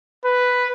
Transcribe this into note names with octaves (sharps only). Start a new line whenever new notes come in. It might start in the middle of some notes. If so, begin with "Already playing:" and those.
B4